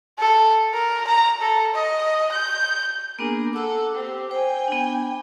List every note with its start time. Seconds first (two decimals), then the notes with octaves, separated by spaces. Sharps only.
0.19 A4
0.73 A#4
1.07 A#5
1.41 A4
1.74 D#5
2.32 G6
3.19 A#3 B3 D4 G#4 A#4
3.53 A4 F#5 D6 E6
3.95 C4 G4
4.31 C5 G5 G#5
4.68 B3 D4